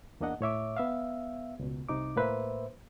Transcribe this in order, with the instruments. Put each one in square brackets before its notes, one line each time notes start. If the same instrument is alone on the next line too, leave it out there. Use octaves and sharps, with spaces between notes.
[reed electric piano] E2 A#3 D4 D#5 F#5
A2 C#5 E5 D6
B3 E5 F5
C#2 B2
C2 C3 D#4 D6
A2 A#3 B4 C5 E5